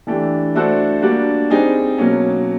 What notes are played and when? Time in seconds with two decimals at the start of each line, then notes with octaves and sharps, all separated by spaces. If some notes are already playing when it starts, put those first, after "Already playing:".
0.07 E3 A3 D4 G4
0.55 A3 D4 F#4 A4 C5
1.02 G3 A#3 D4 F#4
1.50 G3 C4 D#4 G#4
1.98 B2 F#3 A#3 C#4